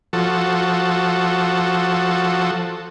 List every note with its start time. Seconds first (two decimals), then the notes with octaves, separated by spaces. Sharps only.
0.13 F3 F#4 A4